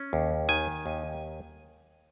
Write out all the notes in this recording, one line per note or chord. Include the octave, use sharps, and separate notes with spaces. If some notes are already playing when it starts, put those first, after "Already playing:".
Already playing: C#4
D#2
D#3 G#5
D#2